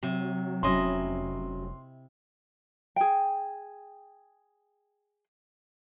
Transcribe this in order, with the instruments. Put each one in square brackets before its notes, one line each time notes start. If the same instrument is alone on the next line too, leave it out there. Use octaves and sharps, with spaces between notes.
[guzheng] C3 [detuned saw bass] F#3
[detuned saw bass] F1 [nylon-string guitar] F#3 C#4 [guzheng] E4 D#5 [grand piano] C6
[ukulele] G#4 G5